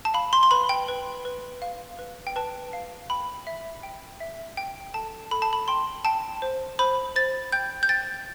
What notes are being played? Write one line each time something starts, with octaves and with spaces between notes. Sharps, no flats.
A5
F5 B5
C6
C6
B4 B5
G5
B4
B4
F5
B4
G5
B4 A5
F5
G5 B5
E5
G5
E5
G5
A4 A5
A4 B5
A5
B5
G5 C6
G5 A5
C5
C5 B5
C5 A6
G5 G6
G6
G5 A6